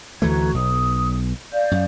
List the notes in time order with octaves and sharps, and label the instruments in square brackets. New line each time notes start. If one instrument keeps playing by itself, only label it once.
[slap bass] D2 E3 A3 [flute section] F#4 A#5 G#6
[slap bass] B1 [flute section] D#6
[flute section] D5 F5 G6
[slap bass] F#2